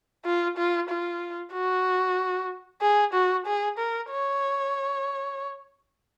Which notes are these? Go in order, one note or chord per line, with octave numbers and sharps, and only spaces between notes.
F4
F4
F4
F#4
G#4
F#4
G#4
A#4
C#5